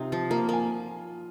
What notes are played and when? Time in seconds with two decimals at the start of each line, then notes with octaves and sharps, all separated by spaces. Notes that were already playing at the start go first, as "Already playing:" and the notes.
Already playing: C3 C4 D#4 F4
0.12 F3
0.30 A#3 F4
0.49 A#3 G#5